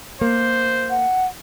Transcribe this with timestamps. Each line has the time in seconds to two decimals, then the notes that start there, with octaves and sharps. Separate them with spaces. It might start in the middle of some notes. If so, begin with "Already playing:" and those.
0.21 A#3 C5
0.90 F#5